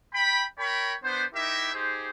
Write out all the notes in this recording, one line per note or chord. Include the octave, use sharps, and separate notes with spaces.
G5 B5
A#4 C#5 G5 B5
B3 D4 C5
D#4 E4 G4 A#4 E5
D#4 G4 G#4 C5